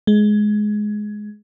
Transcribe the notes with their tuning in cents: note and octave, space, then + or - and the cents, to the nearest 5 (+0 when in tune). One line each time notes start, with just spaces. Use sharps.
G#3 +15